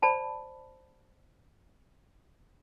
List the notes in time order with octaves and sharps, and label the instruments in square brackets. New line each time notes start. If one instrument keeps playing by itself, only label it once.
[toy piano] C5 D5 A5 B5